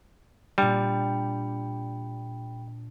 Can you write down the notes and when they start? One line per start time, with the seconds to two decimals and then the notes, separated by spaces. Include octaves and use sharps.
0.58 A#2 G3 D4 G5 B5